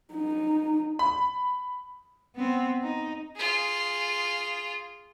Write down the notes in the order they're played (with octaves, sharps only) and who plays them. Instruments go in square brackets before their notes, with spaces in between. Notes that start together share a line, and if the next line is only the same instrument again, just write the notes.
[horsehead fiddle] D#4
[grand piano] B5
[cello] B3 C4
D#4
[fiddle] F4 G#4